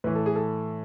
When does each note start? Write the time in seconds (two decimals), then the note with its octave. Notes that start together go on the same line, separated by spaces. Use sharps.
0.04 A2 E3 B4
0.15 A4
0.26 G#4
0.36 A4